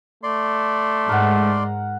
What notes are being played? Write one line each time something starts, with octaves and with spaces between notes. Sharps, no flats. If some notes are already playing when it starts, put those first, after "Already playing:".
A3 D5 C6
G#2 A#4 F#5